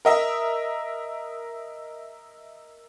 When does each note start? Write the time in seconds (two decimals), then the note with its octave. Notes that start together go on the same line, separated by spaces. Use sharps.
0.05 A#4 D#5 E5